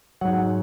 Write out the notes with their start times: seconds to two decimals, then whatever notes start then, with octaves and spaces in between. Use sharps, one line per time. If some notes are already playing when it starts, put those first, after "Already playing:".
0.21 G#2 F#3 F#5